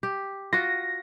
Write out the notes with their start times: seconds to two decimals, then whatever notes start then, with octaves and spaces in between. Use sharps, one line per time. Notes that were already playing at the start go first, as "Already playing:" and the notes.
0.03 G4
0.53 F4 F#4 A#6